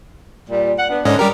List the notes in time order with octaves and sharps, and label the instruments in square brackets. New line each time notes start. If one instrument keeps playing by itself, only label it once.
[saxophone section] A#2 G3
F#5
B3 D4
[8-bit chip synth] G#2 C#4 D#5 [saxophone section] D3
[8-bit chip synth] G3 G4 A#4